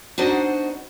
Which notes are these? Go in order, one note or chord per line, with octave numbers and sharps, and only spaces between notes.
B3 D4 D#4 F#4 C5 D#5